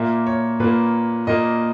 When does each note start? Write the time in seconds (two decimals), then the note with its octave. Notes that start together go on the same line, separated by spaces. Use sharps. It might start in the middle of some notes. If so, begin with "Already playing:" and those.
Already playing: A#2 A#3 E5
0.26 C#5
0.60 A#2 A#3 B4
1.27 A#2 A#3 D#5